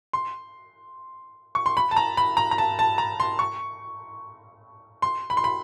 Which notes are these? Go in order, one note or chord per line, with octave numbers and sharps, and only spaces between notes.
C6
C#6
C6
B5
A5
A#5
B5
A#5
A#5
A5
A5
A#5
C6
C#6
C6
B5
C6
B5